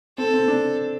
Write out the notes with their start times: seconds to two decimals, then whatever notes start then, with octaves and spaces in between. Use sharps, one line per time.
0.18 C4 A4
0.34 C4
0.48 D4